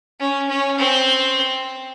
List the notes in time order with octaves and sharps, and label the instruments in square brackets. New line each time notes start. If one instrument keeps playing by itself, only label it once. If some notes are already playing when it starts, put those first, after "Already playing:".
[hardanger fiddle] C#4
C#4
C4